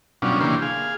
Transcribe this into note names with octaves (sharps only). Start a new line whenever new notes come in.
B2 F#3 G3 C#4 D4 F4
C#3 E3 A#3 D4 G4 C6
G#4 F5